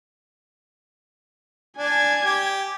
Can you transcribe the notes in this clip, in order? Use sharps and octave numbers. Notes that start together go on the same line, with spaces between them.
D4 G#5 G#6
G4